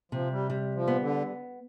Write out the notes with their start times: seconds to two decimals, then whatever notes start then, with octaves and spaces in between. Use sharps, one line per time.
0.12 C3 F3
0.30 G3
0.50 G3
0.74 F3
0.88 B3
1.00 D3